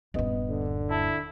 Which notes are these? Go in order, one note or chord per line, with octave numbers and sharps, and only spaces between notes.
D#1 G2 B3 D#5
D3
E4 A5